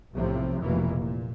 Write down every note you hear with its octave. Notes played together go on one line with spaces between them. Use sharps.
B1 A2 C3 F3
F1 B2 E3 A#3
A#2